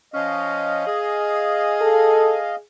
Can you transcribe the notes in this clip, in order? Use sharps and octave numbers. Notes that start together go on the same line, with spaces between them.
F3 C#4 D#5 F5
G#4
A4